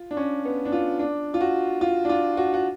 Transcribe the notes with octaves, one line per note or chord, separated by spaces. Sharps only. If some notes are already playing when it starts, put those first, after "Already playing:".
Already playing: F4
D4
C#4
B3
D4
F4
D4
F4
F#4
F4
D4
F4
F#4
F#4